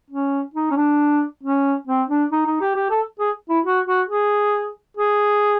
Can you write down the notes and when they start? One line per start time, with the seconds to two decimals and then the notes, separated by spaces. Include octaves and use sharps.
0.10 C#4
0.54 D#4
0.71 C#4
0.76 D4
1.43 C#4
1.87 C4
2.09 D4
2.32 D#4
2.46 D#4
2.61 G4
2.76 G4
2.91 A4
3.20 G#4
3.49 E4
3.65 F#4
3.86 F#4
4.09 G#4
4.97 G#4